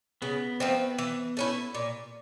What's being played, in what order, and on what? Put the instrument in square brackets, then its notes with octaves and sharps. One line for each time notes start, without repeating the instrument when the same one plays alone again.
[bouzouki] C#3 [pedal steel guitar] B3
[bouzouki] F3 A3 C4
E3
A3 C#4 E4
A#2